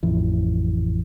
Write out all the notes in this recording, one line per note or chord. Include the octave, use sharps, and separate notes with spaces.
A1 F2 E3